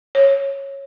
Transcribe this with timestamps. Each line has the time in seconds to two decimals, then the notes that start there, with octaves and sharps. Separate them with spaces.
0.15 C#5